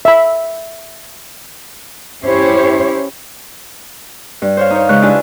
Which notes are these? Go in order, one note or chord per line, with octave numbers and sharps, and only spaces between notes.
E5 B5
C#4 E4 G4 C5 C#5
G2
C5 C#5 F5
D#4 C#5
C#3 G#3 B4 C#6 F#6
D4 E4 F4 G4 D5 G#5